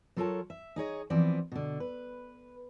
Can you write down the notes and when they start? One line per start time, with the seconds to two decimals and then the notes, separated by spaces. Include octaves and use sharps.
0.16 F#3 F4 A4 A#4 C#5 A5
0.50 E5
0.76 D#4 G#4 C#5 D#5
1.10 E3 F3 B3 C4 D5
1.52 B2 D3
1.80 B4